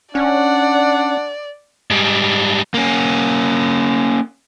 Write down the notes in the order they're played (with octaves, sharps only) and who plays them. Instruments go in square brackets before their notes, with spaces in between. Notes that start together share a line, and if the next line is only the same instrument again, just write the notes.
[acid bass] C#4 [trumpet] D4 [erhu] D5 [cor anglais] F#5
[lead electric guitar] G#2 G3
[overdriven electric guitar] A#3 C#4